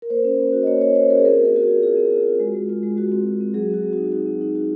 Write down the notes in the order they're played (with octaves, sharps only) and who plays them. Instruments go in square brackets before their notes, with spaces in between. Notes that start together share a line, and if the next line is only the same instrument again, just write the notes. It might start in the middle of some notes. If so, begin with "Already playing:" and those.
[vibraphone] A#4
A#3 C5
C#4
A#3
F#4
D#5
A#3 C#5
F#4 C#5
C#4 C5
F#4 A#4
G#4
C4 A#4
C4 A#4
C4 F#4
G#4
F4
F4 G#4
C4
F4
F4
G#3
G#3
F4
G#3
G#3 F#4
C4
F4
C4
F#3 G#4
C4
F#4
C4
F#4
D#4
D#4 F#4
C4
D#4
F#4